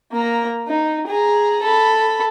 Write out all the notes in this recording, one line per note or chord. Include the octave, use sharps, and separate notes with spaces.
A#3 A#5
D#4
G#4 A#5
A4 B5